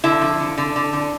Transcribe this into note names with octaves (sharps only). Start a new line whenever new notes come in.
D3 E4
F3
D3
D3
D3
D3